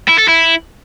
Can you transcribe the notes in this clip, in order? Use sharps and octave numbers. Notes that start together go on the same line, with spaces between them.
E4
A4
E4